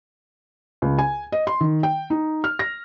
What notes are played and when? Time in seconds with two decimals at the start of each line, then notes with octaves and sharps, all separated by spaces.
0.82 C#2
0.99 G#5
1.32 D#5
1.47 C6
1.61 D#3
1.83 G5
2.10 D#4
2.44 F6
2.59 A#6